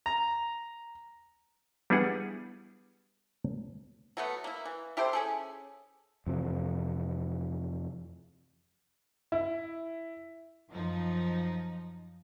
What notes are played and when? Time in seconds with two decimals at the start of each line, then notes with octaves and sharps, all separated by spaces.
0.06 A#5
1.90 G3 B3 D4 E4 G#4 F#5
4.17 F#3 A3 B3
4.44 A#3 E4
4.65 E3
4.97 E4 G4 A4 C5
5.13 C#4 G#4 A4
6.27 F2 C3 E3
9.32 E4
10.70 F#2 F3 D#4